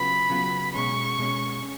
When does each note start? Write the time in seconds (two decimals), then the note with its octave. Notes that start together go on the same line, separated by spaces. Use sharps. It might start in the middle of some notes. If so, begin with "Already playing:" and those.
Already playing: C#3 F#3 B3 F4 B4 B5
0.29 C#3 F#3 B3 F4 B4
0.74 B2 G#3 C#4 C#6
1.18 B2 G#3 C#4
1.63 C#4